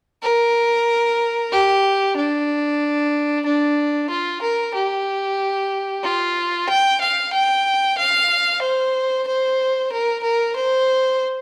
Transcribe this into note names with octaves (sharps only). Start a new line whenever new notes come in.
A#4
G4
D4
D4
F4
A#4
G4
F4
G5
F5
G5
F5
C5
C5
A#4
A#4
C5